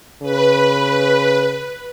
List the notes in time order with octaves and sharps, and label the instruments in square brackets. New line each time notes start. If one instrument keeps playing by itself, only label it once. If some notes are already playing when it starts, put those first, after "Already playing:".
[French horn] C#3 [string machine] B4